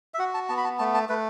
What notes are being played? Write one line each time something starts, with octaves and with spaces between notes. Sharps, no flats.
E5
F#4 F#5
A5
B3 A5
B5
A5
A3 A5
A5
A3 B4